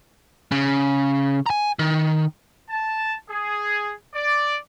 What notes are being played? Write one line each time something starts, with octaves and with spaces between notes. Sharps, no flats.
C#3
G#5 A#5
D#3
A5
G#4
D5